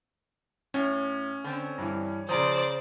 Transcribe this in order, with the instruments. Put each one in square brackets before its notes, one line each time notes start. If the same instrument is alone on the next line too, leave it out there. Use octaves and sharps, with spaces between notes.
[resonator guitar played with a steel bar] A2 [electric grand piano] C#4
[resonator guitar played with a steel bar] D3 C4
[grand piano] G2 E3
[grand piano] C#3 A#5 D#6 [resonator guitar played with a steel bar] F3 [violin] C5 D5